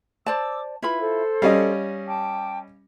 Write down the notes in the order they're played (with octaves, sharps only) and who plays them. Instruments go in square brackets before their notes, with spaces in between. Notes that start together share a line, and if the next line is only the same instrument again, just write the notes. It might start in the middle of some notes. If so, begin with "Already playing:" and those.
[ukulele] C5 D5 A5 [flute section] D6 E6
[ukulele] E4 F4 B5 [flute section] B4
[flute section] A4 C5
[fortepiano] G3 C#4 D#5 [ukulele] F5
[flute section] G5 A5 D6